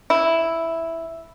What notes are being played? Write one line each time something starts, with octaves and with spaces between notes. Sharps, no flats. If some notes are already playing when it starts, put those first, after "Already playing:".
E4